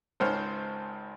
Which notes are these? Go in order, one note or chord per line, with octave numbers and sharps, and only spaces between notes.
G#1 C#2 C5 C#5 F6